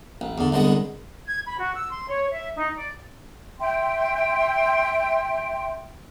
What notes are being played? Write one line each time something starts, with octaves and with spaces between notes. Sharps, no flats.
A1
E2 D3
C2 D3 G#3 B3
G#6
B5
F#4
E6
C6
C#5
E5
D#4
D5
E5 G5 C6